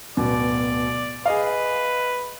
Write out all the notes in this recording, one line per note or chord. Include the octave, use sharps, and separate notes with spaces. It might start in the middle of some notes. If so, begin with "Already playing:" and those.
D1 B2 D5
G#4 B4 D#5 F5